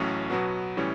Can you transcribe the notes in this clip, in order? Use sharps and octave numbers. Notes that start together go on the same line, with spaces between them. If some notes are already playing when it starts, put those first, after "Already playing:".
Already playing: A1 A2 F#3 C#4
B2 F#3 B3 F#4
A2 E3 G3 C#4